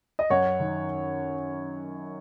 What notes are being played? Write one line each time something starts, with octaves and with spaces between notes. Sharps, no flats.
D#5
F#2 C#5 F#5
D#3